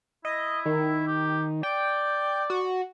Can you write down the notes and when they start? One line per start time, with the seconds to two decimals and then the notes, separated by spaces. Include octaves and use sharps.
0.25 E4 D#5
0.66 D#3
1.07 G4
1.63 D5 G5
2.50 F#4